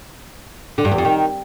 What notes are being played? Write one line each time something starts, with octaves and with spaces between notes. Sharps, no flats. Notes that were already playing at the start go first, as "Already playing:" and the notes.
D3
G2
E2
F2
D#3